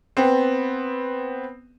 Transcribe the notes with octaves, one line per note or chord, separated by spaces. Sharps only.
B3 C4